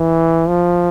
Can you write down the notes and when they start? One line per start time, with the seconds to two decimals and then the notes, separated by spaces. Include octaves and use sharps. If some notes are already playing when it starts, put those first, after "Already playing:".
Already playing: E3
0.48 F3